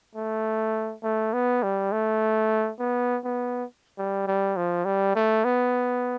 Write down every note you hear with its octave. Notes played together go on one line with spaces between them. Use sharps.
A3
A3
B3
G3
A3
B3
B3
G3
G3
F3
G3
A3
B3